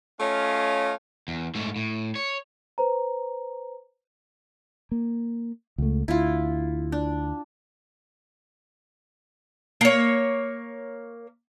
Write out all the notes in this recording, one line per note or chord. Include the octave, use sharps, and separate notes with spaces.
A3 C#4 F4 C#5 D#5 F5
E2
G#2 A3
A2
C#5
B4 C5 A#5
A#3
C#2 A3
D2 E4 F4
D4
A#3 C#5